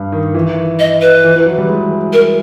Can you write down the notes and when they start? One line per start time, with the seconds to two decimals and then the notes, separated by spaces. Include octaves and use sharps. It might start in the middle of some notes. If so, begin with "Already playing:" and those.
Already playing: G2
0.12 D#3
0.35 E3
0.80 D#5
1.02 B4
1.24 E3
1.36 E3
1.46 F#3
1.58 G3
1.68 G#3
2.13 A#4